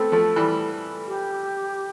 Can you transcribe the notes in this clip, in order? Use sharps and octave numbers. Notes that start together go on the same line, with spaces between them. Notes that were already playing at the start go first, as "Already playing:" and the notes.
Already playing: A3 B3 C4 A4
F3 A3
E3 G3
G4